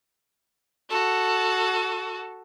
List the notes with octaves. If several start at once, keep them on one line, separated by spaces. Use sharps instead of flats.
F#4 A4